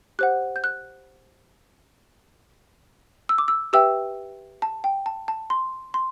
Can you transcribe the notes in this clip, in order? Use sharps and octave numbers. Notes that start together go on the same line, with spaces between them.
G4 C5 F#5 F#6
G6
F#6
E6
D6
E6
G4 B4 E5 G5 E6
A5
G5
A5
A5
C6
C6